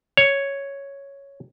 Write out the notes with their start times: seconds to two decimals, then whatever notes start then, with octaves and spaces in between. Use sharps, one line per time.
0.17 C#5